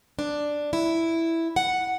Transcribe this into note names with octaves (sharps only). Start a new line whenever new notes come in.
D4
E4
F#5